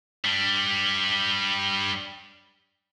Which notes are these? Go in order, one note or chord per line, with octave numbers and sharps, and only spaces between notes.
G2 G3